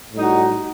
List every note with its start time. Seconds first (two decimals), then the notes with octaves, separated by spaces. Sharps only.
0.14 A2 G3 D#4 F#4